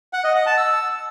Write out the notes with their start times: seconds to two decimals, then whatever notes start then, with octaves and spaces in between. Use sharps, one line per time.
0.13 F#5
0.24 D#5
0.35 F#5
0.46 A5
0.57 E6